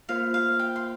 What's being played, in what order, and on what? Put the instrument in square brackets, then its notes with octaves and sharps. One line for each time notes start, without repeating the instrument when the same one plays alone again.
[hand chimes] A#3 F4 C5 [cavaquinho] F5
[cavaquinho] F5
G5
C6